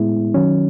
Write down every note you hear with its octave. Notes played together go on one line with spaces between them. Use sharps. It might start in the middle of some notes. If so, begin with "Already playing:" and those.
Already playing: A2 G#3 B3 E4
D#3 F#3 C#4